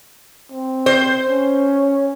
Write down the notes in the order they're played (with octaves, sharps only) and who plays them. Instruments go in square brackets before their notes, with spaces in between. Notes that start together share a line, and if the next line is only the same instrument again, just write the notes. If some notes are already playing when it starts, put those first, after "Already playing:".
[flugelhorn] C4
[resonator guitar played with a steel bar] C5
[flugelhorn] C#4